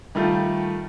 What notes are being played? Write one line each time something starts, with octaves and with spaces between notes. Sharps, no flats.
D#3 G3 A3 F4